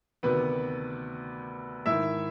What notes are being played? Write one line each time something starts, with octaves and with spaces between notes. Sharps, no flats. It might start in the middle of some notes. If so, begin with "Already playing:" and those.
D2 C3 D#3 B3 B4
G#2 D#3 E4 E5